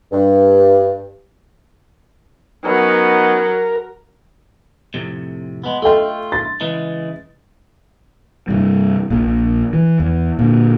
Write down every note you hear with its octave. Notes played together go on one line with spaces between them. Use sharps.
G2
F#3 B3 C#4 D#4 A#4
F2 A2 C3
G#3 B3
A3 F4 A4 D#5 G5
A6
C#3 E3 G#3
G2 C3 G3
A#1 A#2
E3
E2
A#2 D3